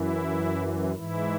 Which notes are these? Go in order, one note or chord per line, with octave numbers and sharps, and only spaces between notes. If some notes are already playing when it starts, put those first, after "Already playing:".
Already playing: F#2 E3 E4
G#2 E3 E4